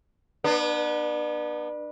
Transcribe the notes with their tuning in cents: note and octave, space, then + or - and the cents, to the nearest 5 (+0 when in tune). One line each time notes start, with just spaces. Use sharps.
B3 -25 D4 +35